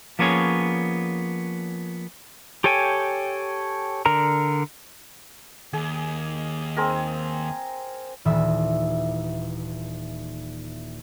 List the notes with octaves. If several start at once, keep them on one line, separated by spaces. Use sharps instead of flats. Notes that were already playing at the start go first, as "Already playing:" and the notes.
F3 A#3 B3 C#4 G#4 C#5
G4 A4 C#5 G5 G#5
D3 A#4 A#5
D#2 G#4
C4 G#4 A#4
D#1 E3 E5 D#6